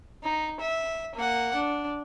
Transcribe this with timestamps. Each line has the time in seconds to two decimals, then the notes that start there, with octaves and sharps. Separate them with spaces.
0.23 D#4
0.61 E5
1.16 A#3 F#5
1.55 D4